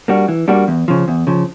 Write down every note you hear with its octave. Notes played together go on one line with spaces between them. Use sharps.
G3 A#3 D4 F#4
E3
G3 A#3 D4 F#4
E2
C#3 F3
E2
C#3 F3